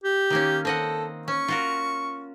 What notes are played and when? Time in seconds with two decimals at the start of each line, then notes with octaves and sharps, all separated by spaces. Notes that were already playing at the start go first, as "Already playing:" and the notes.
0.04 G4
0.30 D#3 A#3 C#4
0.65 C4 A4 D#5 F#5
1.28 C#4 C#6
1.48 F4 F#4 A#4